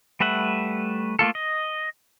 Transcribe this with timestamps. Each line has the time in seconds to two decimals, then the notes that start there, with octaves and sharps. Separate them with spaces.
0.20 G3 A3 B4 E5 F#5
1.19 A3 A#3 F4 A4
1.35 D#5